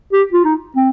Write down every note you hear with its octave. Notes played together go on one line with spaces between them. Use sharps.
G4
F4
D#4
C4